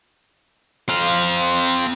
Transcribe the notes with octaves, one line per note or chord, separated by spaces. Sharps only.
C4 F5